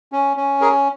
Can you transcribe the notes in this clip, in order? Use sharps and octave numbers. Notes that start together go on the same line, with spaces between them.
C#4
C#4
G#4 A#4